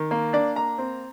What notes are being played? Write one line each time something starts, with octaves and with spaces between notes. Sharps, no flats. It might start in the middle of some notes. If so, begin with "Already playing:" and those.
Already playing: D#3
A#3
D4 D5
A#3 A#5
C4